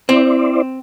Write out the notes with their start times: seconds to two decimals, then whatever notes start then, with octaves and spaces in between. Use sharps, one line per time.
0.09 C4 E4 C5 D5